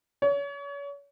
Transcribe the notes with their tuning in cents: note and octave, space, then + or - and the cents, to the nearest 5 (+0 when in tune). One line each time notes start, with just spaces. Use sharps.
C#5 +35